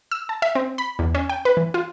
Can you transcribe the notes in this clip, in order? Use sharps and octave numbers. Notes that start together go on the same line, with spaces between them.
E6
A5
E5
C4
B5
E2
C#4
G5
B4
E3
F4